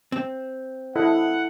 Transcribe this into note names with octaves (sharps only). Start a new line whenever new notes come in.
C4
E4 A4 D#5 F#5